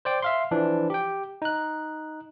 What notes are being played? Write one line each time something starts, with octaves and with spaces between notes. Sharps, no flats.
C5 D5 G5
E5 F5 C6
E3 F3 D4
G4 G5
D#4 F#6